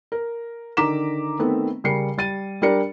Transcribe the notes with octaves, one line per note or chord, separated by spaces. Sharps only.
A#4
D3 D#3 A#5 D6 B6 E7
D#3 A3 B3 C4
C#3 G3 A#4 C7 C#7
G3 A6 D#7
G3 D4 G4 A#4 D5 C#7